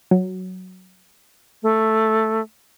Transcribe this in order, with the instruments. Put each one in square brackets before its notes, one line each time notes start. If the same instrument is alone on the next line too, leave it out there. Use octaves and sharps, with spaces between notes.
[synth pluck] F#3
[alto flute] A3